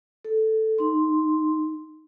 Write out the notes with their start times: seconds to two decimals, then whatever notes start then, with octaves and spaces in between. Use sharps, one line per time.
0.25 A4
0.78 D#4 C6